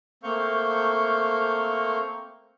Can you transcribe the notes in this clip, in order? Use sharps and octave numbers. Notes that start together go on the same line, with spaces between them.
A3 A#3 C4 F5 C#6 G6